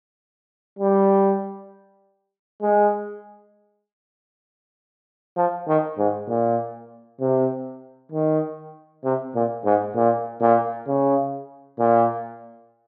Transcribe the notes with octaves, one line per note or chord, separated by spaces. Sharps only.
G3
G#3
F3
D#3
G#2
A#2
C3
D#3
C3
A#2
G#2
A#2
A#2
C#3
A#2